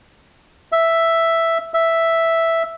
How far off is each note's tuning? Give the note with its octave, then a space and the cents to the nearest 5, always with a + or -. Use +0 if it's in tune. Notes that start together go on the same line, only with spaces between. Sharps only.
E5 +0
E5 +0